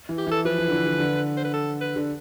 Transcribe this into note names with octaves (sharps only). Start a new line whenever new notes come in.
E3
G4
E3
A4
F3 B4
E3
D3
E3
D3
D3
C5
B4
A4
B4
D3